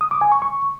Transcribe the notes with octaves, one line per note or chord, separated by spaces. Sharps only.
D#6
D6
G#5
C#6
C#6